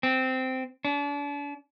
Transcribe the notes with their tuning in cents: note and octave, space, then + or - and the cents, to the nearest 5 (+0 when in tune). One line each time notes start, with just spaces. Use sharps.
C4 -10
D4 -40